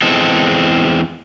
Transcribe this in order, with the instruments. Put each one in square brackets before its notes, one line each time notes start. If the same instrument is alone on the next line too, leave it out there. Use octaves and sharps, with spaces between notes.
[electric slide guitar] E2 G#3 C4 A4